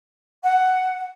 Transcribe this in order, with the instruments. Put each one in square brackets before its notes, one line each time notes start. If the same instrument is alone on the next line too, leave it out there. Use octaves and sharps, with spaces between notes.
[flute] F#5